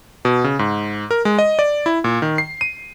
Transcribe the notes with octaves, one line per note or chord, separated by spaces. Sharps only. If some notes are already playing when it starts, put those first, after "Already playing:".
B2
C#3
G#2
A#4
G#3
D#5
D5
E4
A#2
D#3
C7
D#7